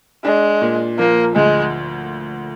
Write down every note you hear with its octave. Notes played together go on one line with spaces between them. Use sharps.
G#3 D4
A#2
F3 A#3
D2 G#3